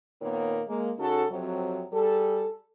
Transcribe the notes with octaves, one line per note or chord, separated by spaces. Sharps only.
A#2 D#3 A#3 B3 C#5
G#3 A#3
C#3 D#4 F#4 A4
F2 C3 F#3
G3 G#4 A4